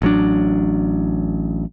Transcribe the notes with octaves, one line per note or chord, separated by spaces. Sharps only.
A1 F#3 D4